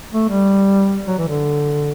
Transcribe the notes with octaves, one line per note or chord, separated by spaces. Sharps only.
A3
G3
F#3
E3
D3